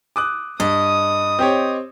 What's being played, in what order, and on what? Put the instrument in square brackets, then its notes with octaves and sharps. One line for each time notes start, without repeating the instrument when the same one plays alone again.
[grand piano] D6 D#6 F#6
[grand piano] G2 [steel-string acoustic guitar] D#5 [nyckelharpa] D#6
[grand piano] C4 G4 C#5